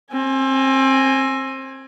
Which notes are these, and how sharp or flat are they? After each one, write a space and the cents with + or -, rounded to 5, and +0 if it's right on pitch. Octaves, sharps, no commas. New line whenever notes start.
C4 +25 G#5 +0